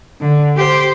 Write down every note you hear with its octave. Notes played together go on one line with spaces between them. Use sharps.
D3
G4 C5